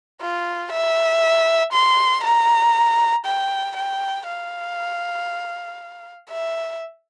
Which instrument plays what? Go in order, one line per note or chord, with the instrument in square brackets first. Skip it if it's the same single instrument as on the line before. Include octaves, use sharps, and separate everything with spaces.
[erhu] F4
E5
C6
A#5
G5
G5
F5
E5